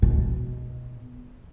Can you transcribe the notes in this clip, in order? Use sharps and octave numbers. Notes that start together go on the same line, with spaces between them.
B2